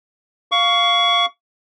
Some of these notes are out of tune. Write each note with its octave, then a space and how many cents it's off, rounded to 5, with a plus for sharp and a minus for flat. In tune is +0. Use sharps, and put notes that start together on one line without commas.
F5 +0 C#6 +25